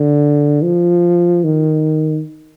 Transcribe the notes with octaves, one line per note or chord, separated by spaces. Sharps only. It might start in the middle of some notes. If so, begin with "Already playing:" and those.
Already playing: D3
F3
D#3